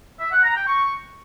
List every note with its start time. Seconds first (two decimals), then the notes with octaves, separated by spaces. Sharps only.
0.20 E5
0.31 F#5
0.43 A#5
0.55 G5
0.67 C#6